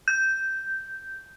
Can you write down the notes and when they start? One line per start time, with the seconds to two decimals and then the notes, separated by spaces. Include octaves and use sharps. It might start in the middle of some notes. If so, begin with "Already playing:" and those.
0.08 G6